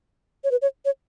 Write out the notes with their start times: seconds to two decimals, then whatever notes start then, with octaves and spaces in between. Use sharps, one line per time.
0.44 C#5
0.51 B4
0.62 C#5
0.85 C#5